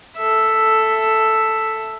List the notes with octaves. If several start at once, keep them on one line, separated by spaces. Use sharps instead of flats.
A4 E5